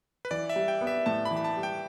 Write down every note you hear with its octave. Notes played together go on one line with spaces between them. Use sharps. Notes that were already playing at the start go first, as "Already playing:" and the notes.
B4
E3 D5
E5
G3
G5
B3
E5
A2 A5
B5
E3
B5
A5
G3
G5